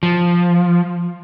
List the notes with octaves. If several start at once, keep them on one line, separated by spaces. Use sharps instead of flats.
F3